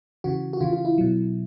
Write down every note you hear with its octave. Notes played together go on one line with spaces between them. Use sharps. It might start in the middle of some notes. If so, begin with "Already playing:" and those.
C#3 E3 F#4
F#4
C#3 E3 F4
F4
E4
B2 F#3